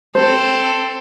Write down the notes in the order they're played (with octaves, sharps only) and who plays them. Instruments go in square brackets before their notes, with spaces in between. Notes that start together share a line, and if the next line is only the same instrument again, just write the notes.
[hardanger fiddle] C4 A4 [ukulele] C5